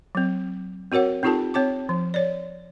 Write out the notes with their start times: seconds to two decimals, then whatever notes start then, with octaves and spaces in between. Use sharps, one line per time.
0.15 F#3 C4
0.92 C4 F#4 A#4 C#5 F#5
1.23 C4 D#4 F4 G4 A4 A5
1.54 C4 C#5 A5 D6
1.89 F3
2.14 C#5 D5